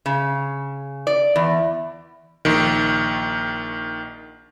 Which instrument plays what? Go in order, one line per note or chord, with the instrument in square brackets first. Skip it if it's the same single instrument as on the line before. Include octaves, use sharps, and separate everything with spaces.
[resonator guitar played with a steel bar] C#3
D5
E2
[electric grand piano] A#1 D#3